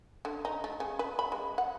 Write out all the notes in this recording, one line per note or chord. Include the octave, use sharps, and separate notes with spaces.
D3
D#4
A3
C#3
B4
B5
G#3
F#5